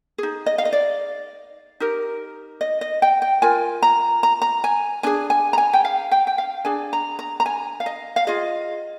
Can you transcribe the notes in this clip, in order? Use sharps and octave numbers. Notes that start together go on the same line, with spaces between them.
D#4 G#4
D#5
F5
D#5
D5
D#4 G4 A#4
D#5
D#5
G5
G5
F4 A#4 G#5
A#5
A#5
A#5
G#5
D4 G#4 G#5
G#5
A#5
G#5
G5
F5
G5
G5
F5
D4 G#4 G#5
A#5
A#5
A#5
G#5
F5
D#5
F5
F4 G#4 D#5